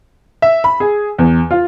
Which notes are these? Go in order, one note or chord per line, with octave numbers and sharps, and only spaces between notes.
E5
B5
G#4
E2
F4